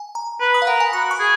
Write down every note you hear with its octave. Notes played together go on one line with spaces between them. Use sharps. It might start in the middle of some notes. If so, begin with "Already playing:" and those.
Already playing: G#5
A#5
B4
D#6
F5
A#4 F#5
G#5
F#4 B5
C#6
G#4